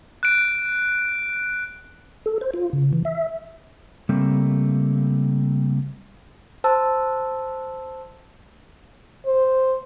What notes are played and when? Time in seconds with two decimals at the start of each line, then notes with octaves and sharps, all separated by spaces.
0.23 F#6 D7
2.26 A4
2.41 C5
2.54 F4
2.73 C#3
2.93 E3
3.05 E5
4.09 C#3 G3 A3 A#3 C4
6.64 C5 A5 E6
9.26 C5